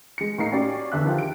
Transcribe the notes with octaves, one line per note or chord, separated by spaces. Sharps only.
G#3 C#7
A2 A#3 D#4 C7 C#7
C#4 F#4 G4 C#5 D5
E2 D3 E5 F#6
D#3 F3 G4
D7